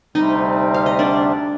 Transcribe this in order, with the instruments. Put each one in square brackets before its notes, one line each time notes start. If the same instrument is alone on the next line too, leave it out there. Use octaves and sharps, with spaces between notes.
[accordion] D2 C3 G3 [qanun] D#4 D#5
[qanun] F5
D#5
D4 D5